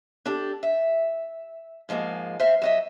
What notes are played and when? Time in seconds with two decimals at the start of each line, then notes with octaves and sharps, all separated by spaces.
0.26 D4 G4 A4
0.63 E5
1.89 G#2 F3 G#3 A#3
2.40 C5 E5 F5
2.62 F#3 D#5 E5